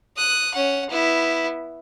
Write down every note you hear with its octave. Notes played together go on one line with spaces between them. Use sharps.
D#6 F#6
C#4 F#5
B3 E4